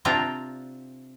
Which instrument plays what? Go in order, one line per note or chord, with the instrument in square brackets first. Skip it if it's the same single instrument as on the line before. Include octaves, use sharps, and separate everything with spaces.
[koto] C3 C4 D4 F4 G5 A#5